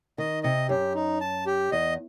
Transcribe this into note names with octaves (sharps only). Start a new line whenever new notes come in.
D#3 D#5
C3 D#5
F#2 G4
D#4
A5
G4
E2 D#5